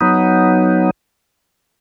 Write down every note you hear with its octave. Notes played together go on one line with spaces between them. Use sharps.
F#3 B3 D#4